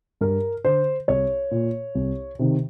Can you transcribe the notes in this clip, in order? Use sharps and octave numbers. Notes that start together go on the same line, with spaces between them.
G2 A#4
D3 C5
C2 C#5
A#2
C2
C3 D#3